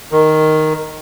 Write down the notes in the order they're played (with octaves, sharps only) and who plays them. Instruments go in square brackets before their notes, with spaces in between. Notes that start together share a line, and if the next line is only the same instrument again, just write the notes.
[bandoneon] D#3